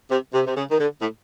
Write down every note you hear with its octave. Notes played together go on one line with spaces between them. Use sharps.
C3
C3
C3
C#3
D#3
D3
A2